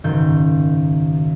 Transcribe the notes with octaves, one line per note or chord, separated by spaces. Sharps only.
F#1 G#2 D#3 G6